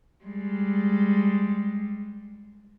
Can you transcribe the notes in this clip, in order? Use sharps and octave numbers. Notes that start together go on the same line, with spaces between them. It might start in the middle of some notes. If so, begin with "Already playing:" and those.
G3 G#3